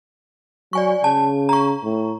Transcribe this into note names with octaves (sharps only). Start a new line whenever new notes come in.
F#3 D5 G#5 C#6
C#3 A5
A#5 C#6
A2